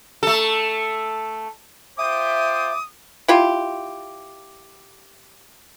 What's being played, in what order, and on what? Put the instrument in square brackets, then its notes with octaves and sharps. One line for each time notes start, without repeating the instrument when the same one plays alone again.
[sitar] A3 A4
[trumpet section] F4 C5 G5 [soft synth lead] E5 [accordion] D6 [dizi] D#6
[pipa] E4 F4 G4